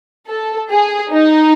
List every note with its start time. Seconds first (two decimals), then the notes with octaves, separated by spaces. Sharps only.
0.26 A4
0.70 G#4
1.13 D#4